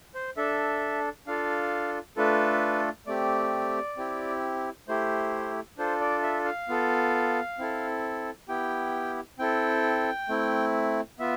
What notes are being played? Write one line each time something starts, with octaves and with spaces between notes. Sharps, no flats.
C5
D4 A4 E5
D4 F4 A4 F5
A3 D4 F4 A4 B4
A3 C4 G4 D5
C4 E4 G4
A3 E4 G4 C5
D4 F4 A4 C5
D5
E5
F5
B3 F4 A4
C4 E4 A4
B3 E4 G4 G5
C4 E4 A4 G5
A3 C4 E4
B3 F4 E5